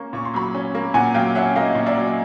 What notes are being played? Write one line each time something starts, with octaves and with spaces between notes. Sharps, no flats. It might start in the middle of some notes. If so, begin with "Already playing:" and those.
Already playing: A#3 C#4 C#6
A#2 C#6
C6
F#3 B5 C#6
C#4
A#3
A#2 F#5 G#5
F#3 F5 G5
C#4 E5 F#5
A#3 D#5 F5
A#2
D5 E5
F#3